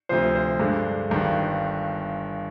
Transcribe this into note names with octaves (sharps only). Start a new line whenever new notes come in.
D2 C3 F3 C5
C5
G2 D3 G#3
G1 G2 D#3